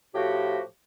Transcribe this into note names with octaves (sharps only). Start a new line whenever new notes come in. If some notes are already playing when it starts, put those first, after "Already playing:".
A2 F3 F#4 G4